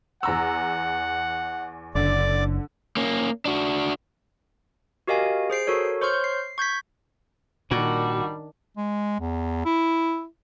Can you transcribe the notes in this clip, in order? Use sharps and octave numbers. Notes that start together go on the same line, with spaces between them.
E2 F#5 A#5 E6
F#1 D3 D5 D6
A#3 C#4
D4 F#4
F#4 G4 A#4 D#5 F5 G#5
G#4 C5 C7 D7
F#4 A4 A#4 C#5
C5 C#5 C6 C#6 F6 G6
C7
C#6 G6 G#6 B6
A#2 D#3 G3 D4 F#4
G#3
E2
E4